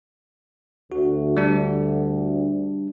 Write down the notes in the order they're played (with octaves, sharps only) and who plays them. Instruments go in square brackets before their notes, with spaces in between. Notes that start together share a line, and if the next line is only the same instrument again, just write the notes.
[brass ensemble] D2 [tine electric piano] F#4
[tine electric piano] G3 D4